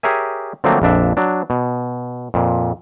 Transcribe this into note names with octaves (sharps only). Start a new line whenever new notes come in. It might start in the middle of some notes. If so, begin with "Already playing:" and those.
G4 G#4 A#4 C#5 E5 G#5
D3 F3 F#3 A3 A#3 C4
A#1 F2 D4 E5
F#3 D4
B2
F2 A#2